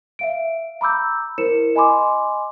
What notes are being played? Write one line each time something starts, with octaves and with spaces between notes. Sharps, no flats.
E5 F5 D7
A#5 B5 D6 E6 G6
E4 A#4 C5 C#7 E7
D#5 G#5 B5 C6 D6